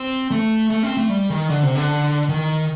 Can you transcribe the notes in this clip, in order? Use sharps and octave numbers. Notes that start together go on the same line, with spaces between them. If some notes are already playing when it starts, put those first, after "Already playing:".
Already playing: C4
A3
A3
C4
A3
G3
D#3
D3
C3
D3
D#3